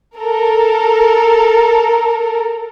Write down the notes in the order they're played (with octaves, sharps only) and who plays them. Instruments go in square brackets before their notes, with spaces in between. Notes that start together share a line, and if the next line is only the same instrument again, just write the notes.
[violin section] A4 A#4